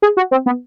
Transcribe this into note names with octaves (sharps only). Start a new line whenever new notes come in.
G#4
F#4
C4
B3